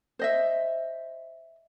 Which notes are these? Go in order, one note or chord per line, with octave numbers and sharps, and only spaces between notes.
C5 D#5 E5